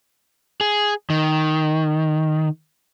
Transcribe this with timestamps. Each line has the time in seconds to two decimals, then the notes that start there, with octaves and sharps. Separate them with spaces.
0.61 G#4
1.10 D#3